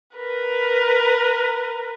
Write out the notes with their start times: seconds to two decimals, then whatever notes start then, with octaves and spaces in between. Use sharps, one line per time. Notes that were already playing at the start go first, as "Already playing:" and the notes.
0.17 A#4 B4